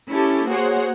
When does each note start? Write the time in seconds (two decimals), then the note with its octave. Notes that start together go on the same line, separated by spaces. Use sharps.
0.11 C#4 E4 G4 A4
0.48 A#3 F#4 G#4 C5 C#5 F#5